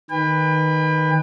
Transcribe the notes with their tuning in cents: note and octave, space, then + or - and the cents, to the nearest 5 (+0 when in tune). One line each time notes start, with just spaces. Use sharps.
D#3 -5 B4 +0 G5 +40